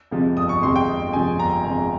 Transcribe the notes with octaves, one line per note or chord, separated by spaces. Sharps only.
F2 C3 F3 G#3
G1 D#6
C#6
F2 C3 F3 G#3 C6
G5
G1
F2 C3 F3 G#3 G#5
G1 A#5
F2 C3 F3 G#3